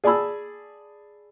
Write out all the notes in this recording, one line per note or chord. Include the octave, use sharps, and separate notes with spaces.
G#4 D5 G#5 A5 B5 E6